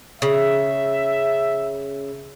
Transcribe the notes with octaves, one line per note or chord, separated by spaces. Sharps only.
C#3 E5